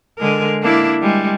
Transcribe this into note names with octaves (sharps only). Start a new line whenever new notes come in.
D3 G#3 A#4
A#3 D4 E4
G3 G#3